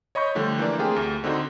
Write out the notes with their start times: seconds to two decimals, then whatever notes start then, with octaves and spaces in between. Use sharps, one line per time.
0.15 C#5 D#5 B5 C#6 G6
0.35 D3 F3 G3 A3
0.59 E3 A#3 D4
0.78 A3 A#3 C4 F4 G4 G#4
0.96 D2
1.24 D3 C4 D#4 F#4